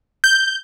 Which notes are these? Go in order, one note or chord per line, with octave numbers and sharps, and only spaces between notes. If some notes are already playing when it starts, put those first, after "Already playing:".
G6